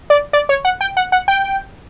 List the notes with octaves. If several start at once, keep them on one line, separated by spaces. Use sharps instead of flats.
D5
D5
C#5
F#5
G5
F#5
F#5
G5